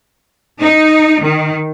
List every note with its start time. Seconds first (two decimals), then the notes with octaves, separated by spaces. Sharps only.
0.61 D#4
1.22 D#3